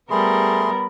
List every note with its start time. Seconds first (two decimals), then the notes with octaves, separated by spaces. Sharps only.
0.10 G3 A3 B3 G#4 A#4 B5 C6